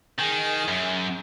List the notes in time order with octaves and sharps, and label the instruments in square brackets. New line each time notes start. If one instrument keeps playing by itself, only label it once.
[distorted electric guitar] D#3 [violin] G#4
[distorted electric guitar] F#2